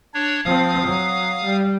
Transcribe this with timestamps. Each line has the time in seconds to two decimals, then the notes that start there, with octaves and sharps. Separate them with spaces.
0.14 D4 C#5
0.45 F3 C4 F5 D#6
0.87 F#3
1.45 G3